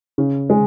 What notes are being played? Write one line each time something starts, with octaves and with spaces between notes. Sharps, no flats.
C#3
G#3